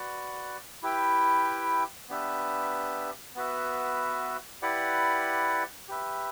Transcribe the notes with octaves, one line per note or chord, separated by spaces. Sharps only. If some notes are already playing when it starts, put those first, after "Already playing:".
Already playing: F#4 B4 D5 F#5
E4 G4 B4 E5 G5
B3 D4 G4 B4 E5
B3 F#4 B4 E5
E4 G4 B4 D5 F#5
G4 B4 E5